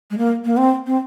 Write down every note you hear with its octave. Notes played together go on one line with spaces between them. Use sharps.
G#3
A#3
A#3
C4
C4